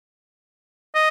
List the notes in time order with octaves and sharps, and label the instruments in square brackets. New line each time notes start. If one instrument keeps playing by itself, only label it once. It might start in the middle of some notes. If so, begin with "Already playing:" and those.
[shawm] D#5